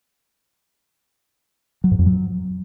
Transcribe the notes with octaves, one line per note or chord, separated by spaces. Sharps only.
F#3
G#2
F2
F#3